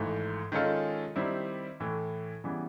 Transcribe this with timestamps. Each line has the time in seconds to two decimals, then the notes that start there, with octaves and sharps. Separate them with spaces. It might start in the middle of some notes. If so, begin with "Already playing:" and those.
Already playing: G#1 G#2 E3 A3
0.52 D#3 G#3 C#4 F4 A4
1.16 D#3 G3 C4 E4
1.80 A2 E3 A3
2.44 C#3 E3 G3 B3